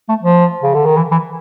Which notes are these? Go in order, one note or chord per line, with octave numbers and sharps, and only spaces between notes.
A3
F3
C#3
D3
D#3
E3
E3